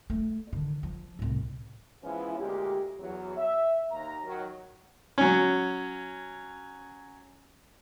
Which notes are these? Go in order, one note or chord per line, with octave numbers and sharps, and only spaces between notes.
A3
D3 D#3
F3
C2 A2
E3 F3 G#3 B3 C#4 E4
D2 A#2 G#3 G4
E2 F#3
E5
D#2 A#5
D#3 F#3
F#3 C#4